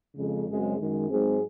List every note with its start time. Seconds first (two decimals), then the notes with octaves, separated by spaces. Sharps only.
0.15 F2 C#3 G#3
0.46 F#2 C#3 F#3 G#3 C4 G#4
0.77 F#2 D#3 G#3
1.09 G#2 F#3 G#3 C4 D#4 G#4